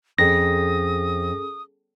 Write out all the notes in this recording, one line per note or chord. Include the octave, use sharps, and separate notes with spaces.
F2 C#4 G#4 A4 D#6 A#6